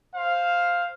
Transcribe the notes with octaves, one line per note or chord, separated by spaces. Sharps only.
C5 F5